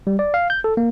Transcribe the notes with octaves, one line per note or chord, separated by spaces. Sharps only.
G3
D5
F5
G6
A4
A#3